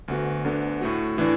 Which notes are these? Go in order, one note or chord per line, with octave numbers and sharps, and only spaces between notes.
D2 D3 B3 F#4
D2 D3 B3 D4
A2 A3 F#4
A2 E3 D4